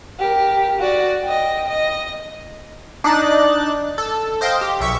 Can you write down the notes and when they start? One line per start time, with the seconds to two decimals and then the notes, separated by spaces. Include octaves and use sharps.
0.20 G4 A#4
0.80 F#4 D5
1.24 D#5 G5
1.69 D#5
3.04 D4 D#4 F#6 A6
3.98 A4
4.41 C5 D#5 F5 G5
4.61 G4
4.80 B1 E5 C#6